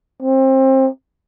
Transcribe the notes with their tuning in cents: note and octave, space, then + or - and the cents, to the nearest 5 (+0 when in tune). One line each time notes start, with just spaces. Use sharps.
C4 +25